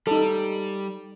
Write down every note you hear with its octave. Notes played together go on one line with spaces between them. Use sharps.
G3 D#4 A4